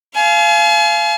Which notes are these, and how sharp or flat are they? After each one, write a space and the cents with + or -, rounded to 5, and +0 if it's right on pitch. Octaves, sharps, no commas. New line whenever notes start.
F5 -25 G#5 +40